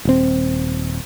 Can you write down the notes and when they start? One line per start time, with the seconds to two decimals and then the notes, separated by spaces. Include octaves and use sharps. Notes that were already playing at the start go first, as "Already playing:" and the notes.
0.05 D#1 C4